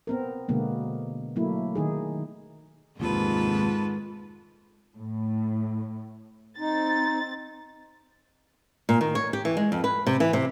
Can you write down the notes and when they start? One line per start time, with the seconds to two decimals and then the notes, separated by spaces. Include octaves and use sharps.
0.07 B3 C4 A#4
0.49 B2 D3 G#3 A#3 B3
1.36 F#3 A3 A#3 E4
1.75 D#3 D#4 G#4
3.00 F1 D#2 G#2 C3 D#3 F4 A4 B4
4.96 A2
6.59 C4 D#4 A6
8.89 A#2
9.01 D#3
9.15 C#5
9.33 G4
9.45 E3
9.57 G#3
9.72 F2
9.84 B4
10.07 C3
10.20 E3
10.33 C3